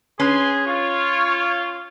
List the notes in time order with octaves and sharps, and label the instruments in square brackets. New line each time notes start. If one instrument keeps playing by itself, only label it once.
[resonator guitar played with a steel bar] C#4 [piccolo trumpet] G#4 [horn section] B4 C6
[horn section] F4 [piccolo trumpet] C#5